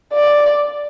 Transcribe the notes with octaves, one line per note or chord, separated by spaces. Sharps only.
D5